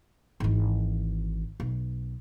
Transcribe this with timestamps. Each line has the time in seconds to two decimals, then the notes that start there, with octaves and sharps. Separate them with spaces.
0.40 G#1 E3
1.60 B1